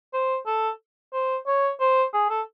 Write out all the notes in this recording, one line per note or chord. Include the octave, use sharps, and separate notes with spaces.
C5
A4
C5
C#5
C5
G#4
A4